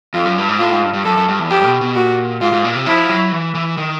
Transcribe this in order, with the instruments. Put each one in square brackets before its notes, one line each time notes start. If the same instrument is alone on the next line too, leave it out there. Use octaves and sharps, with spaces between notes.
[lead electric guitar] F2 [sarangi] F4
[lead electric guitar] F#2
G2
G#2
[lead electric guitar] A2 [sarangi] F4
[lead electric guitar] G#2
G2
G2
[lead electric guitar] F#2 [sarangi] A4
[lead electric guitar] F#2
G2
E2
[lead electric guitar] F2 [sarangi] G4
[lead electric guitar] B2
B2
[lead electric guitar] A#2 [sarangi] F#4
[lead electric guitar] G#2 [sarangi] F4
[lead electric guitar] G#2
A#2
C3
[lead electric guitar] F3 [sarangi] E4
[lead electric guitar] F#3
E3
E3
D#3